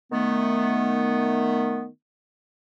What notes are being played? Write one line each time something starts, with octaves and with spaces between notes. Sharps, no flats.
D#3 A3 B3